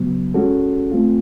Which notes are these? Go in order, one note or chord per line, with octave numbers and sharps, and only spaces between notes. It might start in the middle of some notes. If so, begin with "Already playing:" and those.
Already playing: C#3 F#3 B3
G#3 C#4 F#4 A4
A3 C4 F4